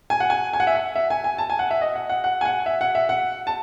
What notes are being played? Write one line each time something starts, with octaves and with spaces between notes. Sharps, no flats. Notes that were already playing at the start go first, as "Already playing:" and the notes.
G#5
F#5
G#5
G#5
F#5
E5
F#5
E5
G#5
G#5
A5
G#5
F#5
E5
D#5
F#5
F#5
F#5
G#5
F#5
E5
F#5
E5
F#5
A5